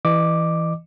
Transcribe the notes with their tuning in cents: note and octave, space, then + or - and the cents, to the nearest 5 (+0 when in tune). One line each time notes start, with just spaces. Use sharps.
E3 +0 D#5 -35 D6 +0